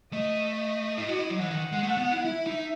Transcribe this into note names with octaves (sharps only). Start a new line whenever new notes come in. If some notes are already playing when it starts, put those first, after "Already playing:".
A3 D#5
D#5
E4
F#4
E4
F#3
E3 F#5
D#3
G#3
A3
B3
E4
E4 E5
D#4